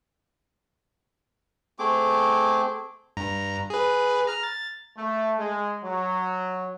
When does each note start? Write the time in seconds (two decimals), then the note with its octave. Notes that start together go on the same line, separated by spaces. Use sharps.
1.79 A3 C4 G#4 D6
3.17 G2 A#5
3.70 G#4 B4
4.27 A#5 F6
4.43 A6
4.96 A3
5.38 G#3
5.83 F#3